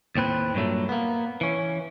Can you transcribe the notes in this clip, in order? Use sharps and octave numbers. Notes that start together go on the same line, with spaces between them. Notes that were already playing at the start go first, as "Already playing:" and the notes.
D#2 A2 C4 B4
G2 A#2 F#3 A3
A#3 B3
E3 C#4